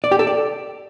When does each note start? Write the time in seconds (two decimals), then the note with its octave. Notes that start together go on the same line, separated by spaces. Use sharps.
0.04 D5
0.11 G4
0.19 A4
0.27 D5